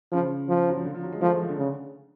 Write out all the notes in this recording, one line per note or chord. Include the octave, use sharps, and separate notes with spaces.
C#3 F3
F3
F#3
F3
D3
F3
F#3
G#3
F3 A3
G#3
F3
D3
C#3